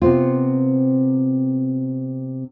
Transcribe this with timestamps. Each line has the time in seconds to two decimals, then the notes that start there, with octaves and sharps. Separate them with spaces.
0.02 C3 B3 C4 F4